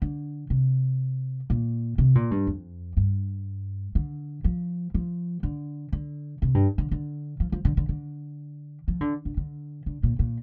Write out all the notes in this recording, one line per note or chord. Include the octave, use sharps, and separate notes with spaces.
D3
C3
A#2
C3
A#2
G2
F2
G2
D3
F3
F3
D3
D3
C3
G2
D3
D3
F3
F3
D3
D3
D3
F3
D3
D3
D3
D3
A#2
A#2